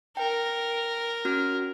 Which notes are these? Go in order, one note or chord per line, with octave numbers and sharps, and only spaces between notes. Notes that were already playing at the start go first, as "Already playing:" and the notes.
A#4 G5
C#4 F#4 F6